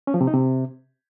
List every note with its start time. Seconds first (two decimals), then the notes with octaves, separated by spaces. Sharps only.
0.07 C#4
0.14 F3
0.21 C3
0.27 D#4
0.34 C3